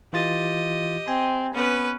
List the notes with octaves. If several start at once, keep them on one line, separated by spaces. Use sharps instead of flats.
E3 F4 G4 D#5 A6
C4 G#5
B3 C#4 B4